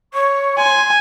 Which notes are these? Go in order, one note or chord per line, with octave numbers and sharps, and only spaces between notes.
C#5 C#6
G#5 C6